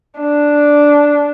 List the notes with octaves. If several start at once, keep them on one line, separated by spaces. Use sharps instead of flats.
D4